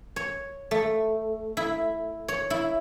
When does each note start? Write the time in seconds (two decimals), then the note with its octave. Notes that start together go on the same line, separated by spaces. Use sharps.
0.16 C#5
0.71 A3
1.57 E4
2.28 C#5
2.50 E4